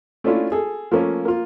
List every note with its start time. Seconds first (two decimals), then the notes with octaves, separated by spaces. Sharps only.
0.24 A3 C#4 D4 E4 F4
0.52 G#4 A4
0.91 F3 A3 A#3 C#4
1.25 A#3 F4